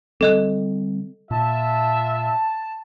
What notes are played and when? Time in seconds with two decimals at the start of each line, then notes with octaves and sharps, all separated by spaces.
0.21 D3 G3 C4 A4 D#5 F#6
1.31 A#2 F4 E5 A5